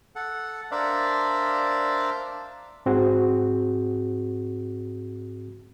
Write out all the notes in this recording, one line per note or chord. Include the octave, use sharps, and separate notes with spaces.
A4 F#5
D4 A#4 C5 D5 E5 F5
G#2 C4 F#4 G#4